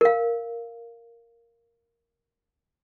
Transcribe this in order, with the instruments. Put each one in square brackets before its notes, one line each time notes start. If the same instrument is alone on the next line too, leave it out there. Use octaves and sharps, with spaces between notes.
[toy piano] A#4 F5